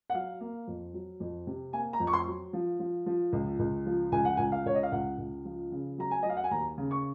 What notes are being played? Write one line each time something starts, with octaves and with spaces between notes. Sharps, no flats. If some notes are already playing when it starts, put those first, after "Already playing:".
F#5
F#3 F5
A#3
F2
F#3
F2
C3
A#3 G#5
A#5
F2
C#6
C6
F#3
F3
F3
F3
C#2
C#2
F3
C#2 G#5
F#5
C#2 G#5
F5
C#2 C#5
D#5
F5
C#2 F#5
C#2
F3
C#3
F#3 A#5
G#5
F#3 D#5
F5
F#5
G#5
D#2 A#5
C#3
C#6